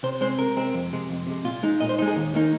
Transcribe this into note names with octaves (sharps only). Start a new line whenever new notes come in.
C3 C5
G#3 C4 C5
C3 A#4
G#3 C4
F2
C3 G#3
F2
C3 G#3
A#2 F4
G#3 D#4
A#2 D#5
C5
G#3 D#4 D#5
G#4
D#2
D#3 A#3 D#4